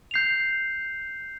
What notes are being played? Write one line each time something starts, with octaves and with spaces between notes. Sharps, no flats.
G6 C7 F7